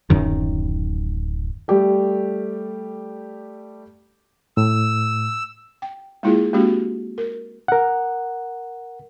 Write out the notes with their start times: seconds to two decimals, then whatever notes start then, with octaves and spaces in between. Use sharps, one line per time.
0.10 D1 F#2 D#3
1.68 G3 A3 G4 A4
4.57 A2 E6
5.82 G5
6.23 G#3 A#3 E4 F4 G#4
6.53 G#3 A#3 C4 D4 F#4 G4
7.18 A#4
7.68 A#4 F#5